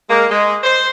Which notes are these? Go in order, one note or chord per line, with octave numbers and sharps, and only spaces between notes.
G#3 A#3
G#3
C5